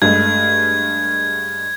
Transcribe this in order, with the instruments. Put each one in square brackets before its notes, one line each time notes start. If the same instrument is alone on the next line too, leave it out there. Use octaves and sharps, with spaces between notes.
[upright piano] G2 G#3 A3 [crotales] G#6